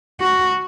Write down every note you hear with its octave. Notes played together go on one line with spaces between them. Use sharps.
F#4